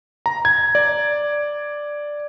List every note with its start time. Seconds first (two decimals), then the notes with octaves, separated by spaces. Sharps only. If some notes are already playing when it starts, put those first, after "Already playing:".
0.26 A#5
0.45 G#6
0.75 D5